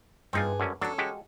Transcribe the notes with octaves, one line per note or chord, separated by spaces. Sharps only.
G2 C4 D#4 F4 G#4
F#2 D3 C#4
F#3 C#4 D4 A4
G#3 F#4 G4